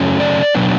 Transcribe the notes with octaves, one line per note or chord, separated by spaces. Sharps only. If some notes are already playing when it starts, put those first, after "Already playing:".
Already playing: F#2 C#3 F#3 A3 C#4
D5
B2 F#3 B3 D4